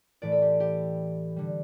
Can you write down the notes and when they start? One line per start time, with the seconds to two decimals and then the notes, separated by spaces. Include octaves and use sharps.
0.22 A2 E3 A3 D5
0.32 A4
0.42 G4
0.60 G4
1.36 D3 G3